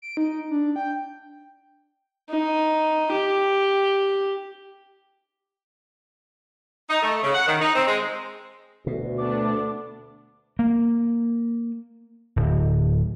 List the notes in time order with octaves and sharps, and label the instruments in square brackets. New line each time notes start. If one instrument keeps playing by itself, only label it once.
[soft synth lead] D7
D#4
D4
G5
[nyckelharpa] D#4
G4
[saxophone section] D#4
A3
C#3
F#5
D#3
D#4
C4
G#3
[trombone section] D2 [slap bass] B2
[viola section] A3 B3 D4 [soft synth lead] D6
[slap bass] A#3
D1